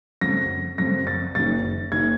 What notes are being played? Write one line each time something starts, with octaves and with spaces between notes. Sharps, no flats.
F#2 C#3 F#3 A3 C4 A#6
F#2 C#3 F#3 A3 C4 A#6
A6
F#1 F#2 D#3 A6
F#1 D#3 G#6